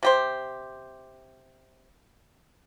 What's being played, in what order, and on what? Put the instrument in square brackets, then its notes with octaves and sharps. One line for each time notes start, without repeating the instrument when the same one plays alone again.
[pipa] C3 G4 C5